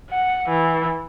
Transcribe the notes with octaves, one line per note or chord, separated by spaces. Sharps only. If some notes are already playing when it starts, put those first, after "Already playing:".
F#5
E3